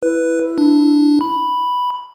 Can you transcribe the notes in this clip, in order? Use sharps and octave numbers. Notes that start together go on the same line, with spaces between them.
E4 B4
D4
B5